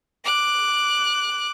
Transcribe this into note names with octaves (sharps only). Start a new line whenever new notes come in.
D6 F#6